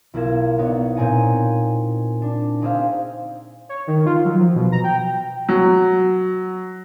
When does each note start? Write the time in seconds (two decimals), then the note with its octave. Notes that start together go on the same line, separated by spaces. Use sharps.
0.14 B1 E4 F4 A#4 G#6 E7
0.58 B3 D#4 C#5 D5
0.96 A#2 C4 C#5 G#5 A#5 D#7
2.22 D4
2.62 C4 D#4 G#4 C5 E5 F5
3.69 C#5
3.87 D#3
4.06 F4
4.25 F#3
4.40 F3
4.56 B2
4.72 A#5
4.84 G5
5.49 F#3